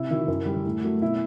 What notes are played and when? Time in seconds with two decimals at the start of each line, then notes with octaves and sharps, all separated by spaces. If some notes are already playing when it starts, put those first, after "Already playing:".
Already playing: C3 E4
0.11 D#3 F#3 E4
0.28 F#2
0.46 D3 G3
0.66 A2
0.84 F#3 A3
1.02 B2 E4